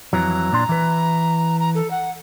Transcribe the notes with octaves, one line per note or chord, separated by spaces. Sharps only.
F2 E3 F#3 A#5
A#2 D4 C6
E3 B4
A#5
A4
F#5